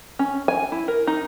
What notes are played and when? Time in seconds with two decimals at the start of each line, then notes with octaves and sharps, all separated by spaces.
0.19 C#4
0.48 G#5
0.72 E4
0.88 A#4
1.07 D#4